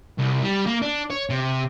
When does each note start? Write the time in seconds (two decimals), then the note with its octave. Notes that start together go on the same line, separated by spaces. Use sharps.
0.18 C2
0.42 G3
0.66 A#3
0.82 D4
1.11 C#5
1.30 C3